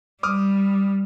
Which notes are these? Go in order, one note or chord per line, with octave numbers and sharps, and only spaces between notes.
G3 D6 D#6 F6